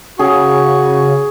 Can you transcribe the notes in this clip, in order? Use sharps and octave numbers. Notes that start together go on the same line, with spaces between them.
C#3 F#4 G#4 C#6